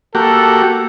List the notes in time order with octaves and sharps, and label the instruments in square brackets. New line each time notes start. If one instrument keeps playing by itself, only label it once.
[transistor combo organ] A#3 F#4 G4 [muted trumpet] A4